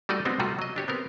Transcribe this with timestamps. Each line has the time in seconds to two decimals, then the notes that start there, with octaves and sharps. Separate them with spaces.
0.09 G3 A3 D#4 F#4 D5 D#5
0.25 G#3 B3 C4 D4 D#4 F#4
0.39 C3 G3 A3 F4 F#4
0.59 F#3 D#5
0.76 D4 G4 C#5
0.88 B3 C4 A#4